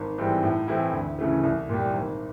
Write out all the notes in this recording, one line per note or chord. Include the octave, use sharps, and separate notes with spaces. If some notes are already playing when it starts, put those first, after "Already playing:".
Already playing: G#1
G#2 E3 G3 C4
A2
E3 A3 C4 E4
D2
C#3 E3 A3
C2
A#2 G3
G#1